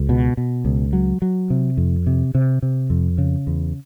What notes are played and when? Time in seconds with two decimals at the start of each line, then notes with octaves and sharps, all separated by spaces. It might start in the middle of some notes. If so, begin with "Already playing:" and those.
Already playing: C#2
0.09 B2
0.37 B2
0.65 C#2
0.93 F#3
1.22 F#3
1.50 C3
1.77 F2
2.07 C3
2.35 C3
2.62 C3
2.90 F2
3.18 C#3
3.47 E2